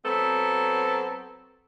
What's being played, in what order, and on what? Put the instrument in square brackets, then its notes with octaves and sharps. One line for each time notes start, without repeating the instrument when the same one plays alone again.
[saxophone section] F#3 B3 C4 A4